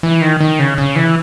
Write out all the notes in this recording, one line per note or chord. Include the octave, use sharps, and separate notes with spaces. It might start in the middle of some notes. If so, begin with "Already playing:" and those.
E3
D#3
D#3
C#3
C#3
E3